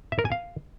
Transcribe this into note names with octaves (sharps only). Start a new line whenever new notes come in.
E5
A#4
G#5
F5